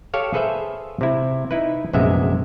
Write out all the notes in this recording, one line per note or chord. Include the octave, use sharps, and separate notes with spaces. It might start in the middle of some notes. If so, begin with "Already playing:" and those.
G4 A4 C#5 F5
G#4 A4 B4 C5 E5
C3 E4
D#4 E4 B4
A#1 F#2 C3 G#3 B3 E5